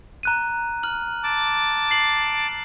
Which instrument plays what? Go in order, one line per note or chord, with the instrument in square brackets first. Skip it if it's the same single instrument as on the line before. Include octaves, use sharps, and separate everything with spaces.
[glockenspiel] A#5 F#6 D#7
F6 F#7
[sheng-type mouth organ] A5 D6
[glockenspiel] C7 F#7